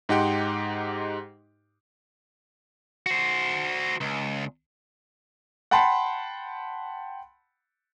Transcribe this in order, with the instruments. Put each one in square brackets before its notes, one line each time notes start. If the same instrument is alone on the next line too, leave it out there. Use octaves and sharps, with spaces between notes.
[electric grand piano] G#2 D#4 G4 F#5 G5 C6
[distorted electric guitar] F#4 C5
C#2
[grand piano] F#5 G5 A5 B5 C6